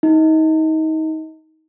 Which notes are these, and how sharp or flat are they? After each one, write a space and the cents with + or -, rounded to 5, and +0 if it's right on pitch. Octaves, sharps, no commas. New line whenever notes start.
D#4 +25